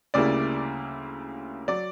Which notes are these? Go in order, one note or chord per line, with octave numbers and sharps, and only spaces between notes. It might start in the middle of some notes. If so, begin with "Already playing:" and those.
D2 C#3 G3 A#3 E4 D5
F#3 D5